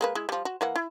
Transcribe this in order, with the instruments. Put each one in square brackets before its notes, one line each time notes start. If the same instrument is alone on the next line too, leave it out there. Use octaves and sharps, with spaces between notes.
[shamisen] G#3 A#3 B4
G#3 E4
F3 G3
F#4
E3 A#3 F#5
E4